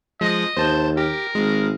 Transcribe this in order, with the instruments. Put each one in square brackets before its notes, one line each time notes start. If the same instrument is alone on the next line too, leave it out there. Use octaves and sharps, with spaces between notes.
[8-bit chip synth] F3 G#3 [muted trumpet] D#5
[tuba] D#2 [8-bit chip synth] C5 A5 G6
[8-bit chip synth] G4 [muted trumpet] A#4
[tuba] G#1 [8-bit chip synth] G#3